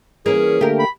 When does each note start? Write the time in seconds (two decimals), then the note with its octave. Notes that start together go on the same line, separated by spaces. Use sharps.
0.26 E3 A#3 C#4 G#4
0.61 D3 A3 A#3 G4 A#4
0.79 B5